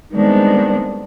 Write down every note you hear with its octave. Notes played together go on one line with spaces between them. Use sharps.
D#3 G3 G#3 B3 C4 D4